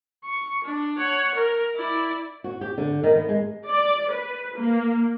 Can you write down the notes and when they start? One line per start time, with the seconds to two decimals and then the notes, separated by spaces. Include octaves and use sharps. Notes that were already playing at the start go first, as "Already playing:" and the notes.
0.25 C#6
0.64 D4
0.98 C#5 F#5
1.35 A#4
1.76 E4 D5
2.44 F#4
2.61 G4
2.78 D3
3.03 D#3
3.15 B3
3.29 G#3
3.67 D5
4.10 B4
4.56 A#3